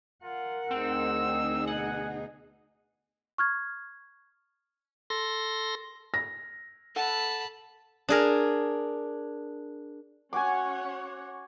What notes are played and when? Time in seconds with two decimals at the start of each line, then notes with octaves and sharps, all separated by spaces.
0.23 F4 A#4 F#5
0.70 D2 C4 D#4 G#4 E6
1.67 B2 F#5 G#5
3.38 C#6 F6 G#6
5.10 A4 C6 A#6
6.14 A#6
6.96 A4 F#5 A5 B5
8.09 D4 G#4 A#4
10.33 C#4 F#4 C#5 F#5 G#5 C6 D6